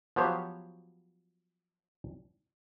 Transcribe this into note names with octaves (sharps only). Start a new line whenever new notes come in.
F3 F#3 B3 G4 C5 C#5